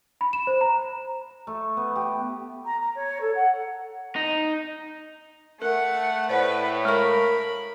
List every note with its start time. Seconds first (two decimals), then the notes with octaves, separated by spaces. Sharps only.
0.21 B5
0.33 E7
0.47 C5
0.61 A#5
1.47 A3
1.77 B3
1.96 G4
2.65 A#5
2.81 A#5
2.95 C#5
3.21 A4
3.35 F#5
4.16 D#4
5.62 A3 A#4 F#5
6.29 A2 B4 C5 D5 F#5
6.85 G#3 A#4 E5 B5 C#6